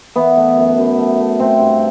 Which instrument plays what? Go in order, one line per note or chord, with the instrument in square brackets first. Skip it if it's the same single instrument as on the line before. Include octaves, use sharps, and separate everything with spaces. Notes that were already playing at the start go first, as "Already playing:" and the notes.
[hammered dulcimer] E3 B3
A3
F#2
F#2
A3
A3
A3 C4
G2